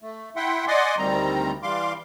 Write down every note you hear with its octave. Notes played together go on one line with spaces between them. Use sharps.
A3
E4 E5 F#5 G5 C6
D5 D#5 F#5 G#5 C6 D6
D2 D#3 G3 C4 A#5
E3 G3 F5 C6 D6